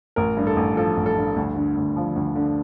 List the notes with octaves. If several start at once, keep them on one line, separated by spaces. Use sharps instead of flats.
A1 A#4
G2
A4
A1
F3 A4
A1
A4
G2
D2
D3
D2
F3
D2
D3